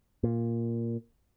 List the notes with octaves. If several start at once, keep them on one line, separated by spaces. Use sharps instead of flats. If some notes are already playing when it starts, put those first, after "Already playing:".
A#2